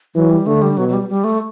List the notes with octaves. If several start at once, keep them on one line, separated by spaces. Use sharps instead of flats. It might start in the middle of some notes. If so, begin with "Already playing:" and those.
E3 F#3
G3
D3 A3
G3
B2 F#3
F#3
G3
G3
A3